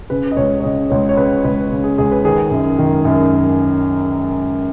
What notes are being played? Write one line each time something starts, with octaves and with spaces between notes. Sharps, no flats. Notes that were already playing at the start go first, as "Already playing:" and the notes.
C#3 B4
D#5
C#2 C#5
C#5
C#3 D#5
C#2 C#5
C#5
C#3 B4
C#2 B4
C#3
G#4
C#2 G#4
B4
D#3 G#4
F#2
D#3
F#2